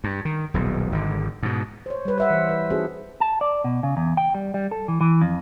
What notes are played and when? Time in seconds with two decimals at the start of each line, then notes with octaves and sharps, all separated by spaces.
0.04 G2
0.25 D#3
0.54 D#1 B1
0.92 G#1 D3
1.43 G#2 B2
1.86 C5 C#5
2.05 G3 B4
2.18 B4 E5 F#5
2.30 E3 C5
2.49 B4
2.70 C4 D#4 F#4 G#4 A4
3.20 A5
3.41 D5
3.64 B2
3.83 C#3
3.97 E2
4.17 G5
4.34 G3
4.54 G3
4.71 A4
4.88 E3
5.01 E3
5.21 F2